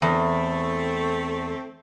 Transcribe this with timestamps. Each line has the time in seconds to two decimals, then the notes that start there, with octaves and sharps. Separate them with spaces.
0.02 E2 A3 C4